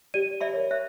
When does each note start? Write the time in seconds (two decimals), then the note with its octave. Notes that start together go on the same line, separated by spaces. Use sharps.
0.14 G4 D5 D#7
0.41 D5 E5 B5
0.54 A#4 C#5
0.71 E5 F#6